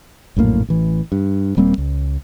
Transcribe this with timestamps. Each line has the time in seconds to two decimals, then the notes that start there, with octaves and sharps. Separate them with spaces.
0.37 A#1 F#2 A2 A#3
0.69 A1 E3
1.12 G2
1.57 D#1 G3 A#3 C4
1.78 C#2